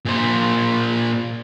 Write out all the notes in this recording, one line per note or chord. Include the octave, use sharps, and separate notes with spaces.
A#2 C5